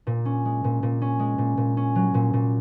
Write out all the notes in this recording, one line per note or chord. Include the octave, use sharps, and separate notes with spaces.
A#2
C#4
G#3
A#2
A#2
C#4
G#3
A#2
A#2
C#4
F#3
A#2
A#2